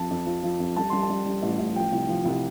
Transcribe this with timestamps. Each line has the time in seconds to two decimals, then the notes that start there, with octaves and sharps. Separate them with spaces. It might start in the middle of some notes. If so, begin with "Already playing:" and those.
Already playing: F2 F3 A5
0.11 F2
0.27 F3
0.43 F3
0.60 F2
0.76 G3 A5
0.90 G3 C6
1.02 A5
1.10 G3
1.26 G3
1.42 A1
1.59 A1
1.76 F3 G5
1.93 C2
2.09 F3
2.25 C2